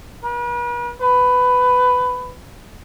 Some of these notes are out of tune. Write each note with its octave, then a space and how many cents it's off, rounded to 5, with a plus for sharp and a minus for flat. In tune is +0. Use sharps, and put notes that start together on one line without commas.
B4 -45
B4 +15